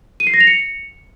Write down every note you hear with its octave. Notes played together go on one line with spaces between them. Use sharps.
D#7
C7
A#6
F7
C#7